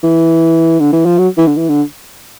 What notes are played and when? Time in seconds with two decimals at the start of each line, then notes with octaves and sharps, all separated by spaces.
0.03 E3
0.80 D3
0.93 E3
1.06 F3
1.18 F#3
1.38 E3
1.47 D3
1.57 E3
1.69 D3